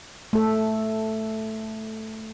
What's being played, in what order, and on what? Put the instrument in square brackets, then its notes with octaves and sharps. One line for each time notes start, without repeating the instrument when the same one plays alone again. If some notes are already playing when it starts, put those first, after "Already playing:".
[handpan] A3 A4